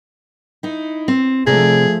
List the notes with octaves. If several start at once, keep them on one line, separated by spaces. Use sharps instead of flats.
D#4 E4
C4
C3 F3 A3 G#4 D5